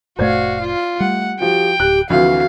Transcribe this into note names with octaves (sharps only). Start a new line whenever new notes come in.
F1 A2 A3 F#4 C5 D5 F5 G#6
F4
G3 A3 F#5
F3 F#4 G4 G5
D1 G4 F#6
D2 C3 E3 F3 F#4 F5